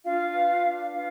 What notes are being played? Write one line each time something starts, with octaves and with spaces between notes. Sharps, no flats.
D4 F4 F5
B4
D4
F4 B4 F5